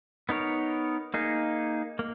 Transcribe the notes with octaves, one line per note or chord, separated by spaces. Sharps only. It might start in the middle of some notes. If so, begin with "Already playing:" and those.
B3 D#4 A#4 C#5
A#3 D#4 G#4
A#3